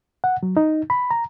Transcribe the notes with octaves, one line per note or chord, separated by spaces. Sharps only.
F#5
F#3
D#4
B5
A#5